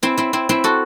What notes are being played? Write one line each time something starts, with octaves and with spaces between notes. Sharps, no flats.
C4 E4
C4 E4
C4 E4
C4 E4
F#4 A4